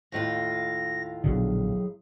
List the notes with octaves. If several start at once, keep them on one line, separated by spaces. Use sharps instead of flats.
D#2 A2 F4 A#6
A#1 B2 D3 F#3 G#4